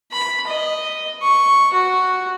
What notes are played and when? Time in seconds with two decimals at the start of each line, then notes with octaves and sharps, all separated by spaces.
0.12 B5
0.47 D#5
1.22 C#6
1.73 F#4